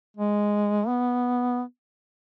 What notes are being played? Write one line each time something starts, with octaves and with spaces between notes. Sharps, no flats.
G#3
B3